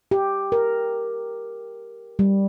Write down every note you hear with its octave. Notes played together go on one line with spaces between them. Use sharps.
G4
A#4
G3